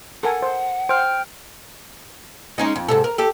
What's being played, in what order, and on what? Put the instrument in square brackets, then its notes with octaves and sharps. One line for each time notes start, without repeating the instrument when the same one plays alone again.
[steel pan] A4 A#4 G#5 [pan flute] F#5
[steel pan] C5
[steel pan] C5 [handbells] G5 F6
[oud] G#3 C#4 D#4
F2
G#2 C3 A4
A#4
G4 A4